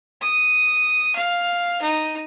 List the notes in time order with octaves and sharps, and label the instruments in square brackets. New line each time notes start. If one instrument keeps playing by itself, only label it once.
[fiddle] D#6
F5
D#4